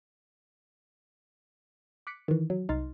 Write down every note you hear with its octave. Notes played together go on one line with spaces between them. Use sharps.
D6 F#6 B6 C#7 D7
D#3 E3
F#3
C2 D#4 C6 F6 A6